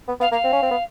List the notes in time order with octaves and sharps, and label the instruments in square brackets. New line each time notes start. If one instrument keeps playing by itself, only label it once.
[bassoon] B3
[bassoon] B3 [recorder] F5
[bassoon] A#3 [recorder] F5
[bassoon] C4
C#4
C4
B3